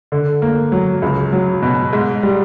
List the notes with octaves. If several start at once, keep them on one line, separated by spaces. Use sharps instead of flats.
D3
A#3
F#3
C#2
F#3
B2
G#2
G3